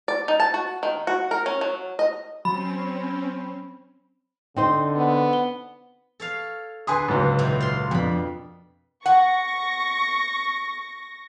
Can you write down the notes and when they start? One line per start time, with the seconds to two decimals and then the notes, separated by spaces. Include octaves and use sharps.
0.08 D5
0.28 D#4
0.40 A5
0.54 F#4
0.83 D#3
1.07 F#4
1.31 A#4
1.46 C#4
1.61 F#3
1.99 D#5
2.45 F#3 C4 C#4 B5
4.57 D3 C4 D#4 C5 G5 C6
4.95 B3
5.33 G7
6.20 A4 C#5 F5
6.87 D3 G#4 B4 G#5 C6 D#6
7.08 C#2 G#2 F#3
7.39 A#2 D#3 E4
7.60 F4 C6
7.91 F2 B2 D4 B5
9.06 F#5 C#6 A#6